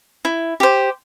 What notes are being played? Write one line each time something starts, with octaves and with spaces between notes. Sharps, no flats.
E4
G4 C5